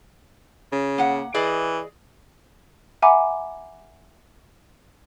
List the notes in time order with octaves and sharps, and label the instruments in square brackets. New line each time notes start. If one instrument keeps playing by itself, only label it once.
[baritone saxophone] C#3
[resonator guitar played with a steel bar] A#3 F#5
[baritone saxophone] E3 [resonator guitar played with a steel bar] G#4 D5 D#5
[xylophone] E5 F#5 G#5 A#5 B5 D6